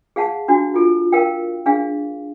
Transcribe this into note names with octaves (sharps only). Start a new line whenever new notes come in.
G#4 F5 F#5 A5
D4 F#4
F4 A4
A#4 F5 G5
D4 G#4 F5